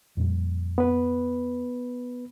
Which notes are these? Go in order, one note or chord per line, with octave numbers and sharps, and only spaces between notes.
F2 A#2 G3
B3 B4